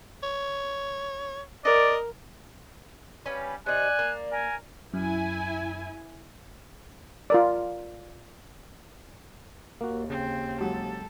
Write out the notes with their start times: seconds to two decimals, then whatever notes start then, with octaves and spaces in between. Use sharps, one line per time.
0.23 C#5
1.65 A#4 D5 D#5
3.26 G3 C#4 B4 F5
3.66 C3 D#4 D5 G#5 F#6
3.99 A#3
4.32 A#4 G#5
4.94 F#2 E4 G#5
7.30 F4 A#4 D5
9.81 D#2 A#3 F#4
10.09 C#3 C4
10.60 F#3 G#3 G4 A4